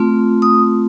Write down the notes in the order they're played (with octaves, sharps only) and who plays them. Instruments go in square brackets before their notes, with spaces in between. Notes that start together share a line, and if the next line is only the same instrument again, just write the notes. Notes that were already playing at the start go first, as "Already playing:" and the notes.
Already playing: [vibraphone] A3 C4 F4
D#6